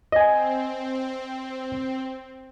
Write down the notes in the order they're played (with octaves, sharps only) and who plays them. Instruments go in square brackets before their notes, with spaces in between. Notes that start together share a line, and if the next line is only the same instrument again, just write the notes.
[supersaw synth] C4 [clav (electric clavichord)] D#5 G#5